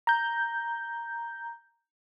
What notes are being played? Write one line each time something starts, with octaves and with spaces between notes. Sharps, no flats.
A#5 G6